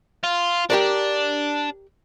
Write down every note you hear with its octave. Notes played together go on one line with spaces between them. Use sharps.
F4
D4 G4 A#4 D5